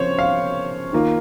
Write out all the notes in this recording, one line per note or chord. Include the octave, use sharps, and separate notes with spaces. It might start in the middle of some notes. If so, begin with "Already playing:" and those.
Already playing: C#3 F3 C4 C5 C#5
F5
D#3 A#3 F4